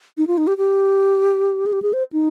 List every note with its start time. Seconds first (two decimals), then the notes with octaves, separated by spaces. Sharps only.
0.18 D#4
0.27 F4
0.38 D#4
0.47 G4
0.58 G4
1.66 G#4
1.73 G4
1.82 G#4
1.93 C5
2.13 D#4